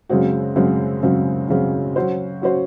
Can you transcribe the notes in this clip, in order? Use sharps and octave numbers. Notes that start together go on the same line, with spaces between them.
F#2 C#3 G#3 C4 F#4
F#2 C#3 G#3 C4 F#4
F#2 C#3 G#3 C4 F#4
F#2 C#3 G#3 C4 F#4
F#3 C#4 F#4 C5
F#3 C#4 F#4 C5